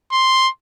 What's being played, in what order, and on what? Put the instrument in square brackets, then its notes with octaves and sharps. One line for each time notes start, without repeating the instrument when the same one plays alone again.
[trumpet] C6